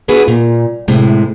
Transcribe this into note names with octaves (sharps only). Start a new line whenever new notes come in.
B3 D4 F#4 G#4 B4
A#2
A2 C3 G#3